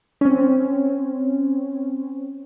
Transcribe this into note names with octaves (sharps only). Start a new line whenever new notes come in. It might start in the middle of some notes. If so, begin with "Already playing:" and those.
C4 C#4